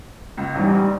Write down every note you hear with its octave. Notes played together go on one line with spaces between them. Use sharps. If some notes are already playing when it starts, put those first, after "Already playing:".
C#2
A1 E2 G#2 G3
G#2